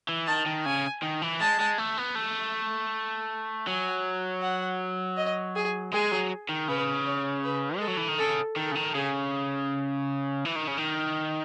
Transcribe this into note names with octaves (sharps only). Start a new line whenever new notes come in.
E3
D#3 A5
D#3
C#3 G#5
D#3
E3
G#3 A5
G#3
A3
B3
A3
F#3 G#5
F#5
D#5
G#4
G#3 G#4
F#3
D#3
C#3 B4
C#5
B4
G#3 A4
F#3
E3
D#3
C#3 A4
D#3 A4
C#3
D#3
C#3 G#4
E3
D#3
C#3
D#3